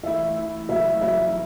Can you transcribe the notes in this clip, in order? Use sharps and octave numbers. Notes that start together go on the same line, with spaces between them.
E3 A3 E4 E5
E3 A3 E4
C#3 F#3 A3 E4 E5
C#3 F#3 A3 E4 E5